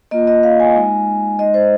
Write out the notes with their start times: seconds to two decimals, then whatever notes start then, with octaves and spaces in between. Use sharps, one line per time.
0.11 A#3 F4 D#5
0.27 D#5
0.43 F5
0.60 G#5
0.75 G#3 D#4
1.39 G#3 D#4 D#5
1.54 C5